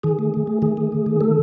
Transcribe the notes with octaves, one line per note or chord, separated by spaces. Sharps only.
D#3 G#4
A3
A3
A3
D#3 G#4
A3
A3
D#3
A3 A4